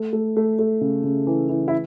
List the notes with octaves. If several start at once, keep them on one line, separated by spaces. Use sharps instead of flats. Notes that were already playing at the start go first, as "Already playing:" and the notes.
Already playing: A3
A3
A3
A3
C#3
C#3
E3
E3
E4